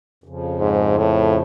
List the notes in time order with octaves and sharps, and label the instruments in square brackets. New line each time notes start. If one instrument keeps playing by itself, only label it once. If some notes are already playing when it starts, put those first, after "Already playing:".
[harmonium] F2 C#3 F3
[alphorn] G#2
A2